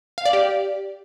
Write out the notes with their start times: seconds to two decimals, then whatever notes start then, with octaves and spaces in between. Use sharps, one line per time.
0.18 F5
0.26 D5
0.33 G4